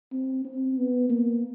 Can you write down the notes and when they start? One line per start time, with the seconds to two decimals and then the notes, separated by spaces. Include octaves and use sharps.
0.12 C4
0.45 C4
0.78 B3
1.10 A#3